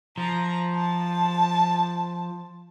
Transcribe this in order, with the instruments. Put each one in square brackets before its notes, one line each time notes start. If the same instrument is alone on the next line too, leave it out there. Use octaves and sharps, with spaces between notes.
[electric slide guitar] F3 [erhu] A#5
[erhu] A5